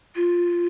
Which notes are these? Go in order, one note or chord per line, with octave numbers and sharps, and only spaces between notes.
F4